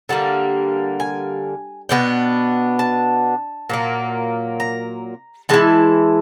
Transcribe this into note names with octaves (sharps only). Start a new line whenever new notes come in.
D3 G3 A#3 A5
G#5
B2 G3 B3 D4 G5
A5
A#2 F#3 A#3
A#5
E3 G#3 E4 A5